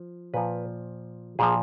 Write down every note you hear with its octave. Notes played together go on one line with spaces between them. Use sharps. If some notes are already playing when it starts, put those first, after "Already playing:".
Already playing: F3
A#2 F3 B4
A#2 F3 G#4